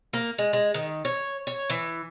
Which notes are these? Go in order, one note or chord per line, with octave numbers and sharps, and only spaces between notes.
A#3
G#3
G#3
D#3
C#5
C#5
E3